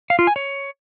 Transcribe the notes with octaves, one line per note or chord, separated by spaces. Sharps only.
F5
F4
G#5
C#5